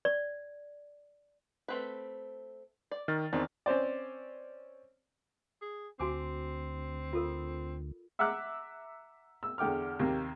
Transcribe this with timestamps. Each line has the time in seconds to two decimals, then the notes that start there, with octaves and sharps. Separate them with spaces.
0.05 D5
1.68 A3 C4 B4
2.91 D5
3.08 D#3 F6 A6
3.33 E2 D#3 C4 D4
3.66 C4 C#4 C5 D5
5.62 G#4
6.00 D2 C4 F#4 G#5 D6
7.13 F4 A4 A#4
8.19 E5 F#5 A#5 D6 F#6
9.43 E6
9.58 E2 D3 G5 D6 F6
9.99 D#2 C3 A#3 G4